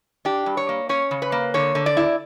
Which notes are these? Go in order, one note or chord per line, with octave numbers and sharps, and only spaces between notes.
D4 G4
G2
C#5
A#3
C#4 C#5
C#3
B4
A#3
D3 C#5
D3
D5
E4